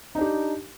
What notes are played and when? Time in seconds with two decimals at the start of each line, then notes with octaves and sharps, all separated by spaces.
0.15 D#4
0.18 D4
0.21 G4